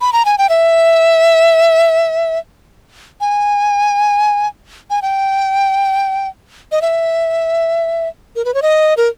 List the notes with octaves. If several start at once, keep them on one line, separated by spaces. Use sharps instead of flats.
B5
A#5
G#5
G5
E5
G#5
G#5
G5
D#5
E5
A#4
B4
C#5
D#5
A#4